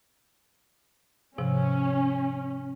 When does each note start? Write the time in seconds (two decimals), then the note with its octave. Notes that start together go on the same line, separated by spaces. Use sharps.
1.38 G#2 C3 F3 C#4